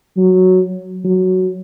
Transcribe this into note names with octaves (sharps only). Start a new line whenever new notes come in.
F#3
F#3